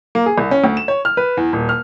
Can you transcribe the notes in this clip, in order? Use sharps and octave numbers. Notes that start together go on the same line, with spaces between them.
A#3
G#4
C2
C#4
D2
E7
C#5
F6
B4
E2
D#1
F6